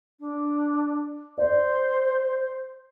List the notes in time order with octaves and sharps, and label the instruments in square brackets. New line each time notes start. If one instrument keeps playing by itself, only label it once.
[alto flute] D4
[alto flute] C5 [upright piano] D5